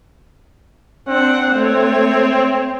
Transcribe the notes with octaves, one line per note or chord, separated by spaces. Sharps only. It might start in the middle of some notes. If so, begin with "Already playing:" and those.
C4 D4 F#5
A3 C#5